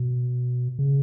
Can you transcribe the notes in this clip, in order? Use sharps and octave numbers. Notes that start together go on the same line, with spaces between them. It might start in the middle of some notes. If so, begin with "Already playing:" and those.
Already playing: B2
C#3